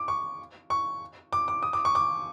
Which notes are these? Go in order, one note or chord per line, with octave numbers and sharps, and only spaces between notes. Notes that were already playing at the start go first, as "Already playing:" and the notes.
Already playing: D6
C#6
C#6
D6
D6
D#6
D6
C#6
D6